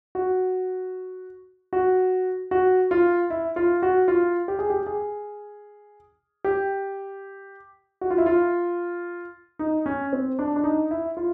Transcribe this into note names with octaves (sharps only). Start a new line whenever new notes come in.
F#4
F#4
F#4
F4
E4
F4
F#4
F4
G4
G#4
G4
G#4
G4
F#4
F4
E4
F4
D#4
C#4
C4
D4
D4
D#4
E4
F4